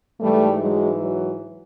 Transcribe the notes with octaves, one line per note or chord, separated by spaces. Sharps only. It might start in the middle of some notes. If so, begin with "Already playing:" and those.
G#2 E3 G3 A3
F#3 G#3
F#3